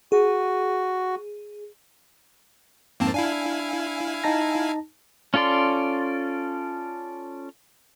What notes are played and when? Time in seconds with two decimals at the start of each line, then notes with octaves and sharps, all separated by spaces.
0.12 F#4 G#4
3.00 F2 G#2 A#3 C4 A5
3.14 D4 E4 F5 G#5
4.24 D#4 A5 A#6
5.34 C#4 F4 A4 D5 C6